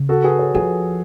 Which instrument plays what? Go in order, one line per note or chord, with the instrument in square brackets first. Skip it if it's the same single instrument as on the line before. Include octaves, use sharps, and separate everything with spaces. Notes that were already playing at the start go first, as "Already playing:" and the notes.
Already playing: [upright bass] C#3
[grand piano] F#4 A4
G#4 B4
A4 C#5
[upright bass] F3 [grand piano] G#4 B4